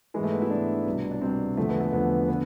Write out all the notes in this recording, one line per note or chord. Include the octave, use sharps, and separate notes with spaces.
G#2 E3 G#3 A3
B3
E4
G#2 E3 D4
C2 B2
D4
C2 B2 C4
E2 D3 F3 A3
B3
A3
E2 D3 F3 B3
D3 B3